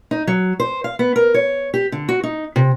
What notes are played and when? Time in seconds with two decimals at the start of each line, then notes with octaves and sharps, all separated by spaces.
0.11 D#4
0.27 F#3
0.60 C5
0.84 F5
0.99 B3
1.16 A#4
1.34 C#5
1.74 G4
1.92 D3
2.09 F#4
2.24 D#4
2.56 C3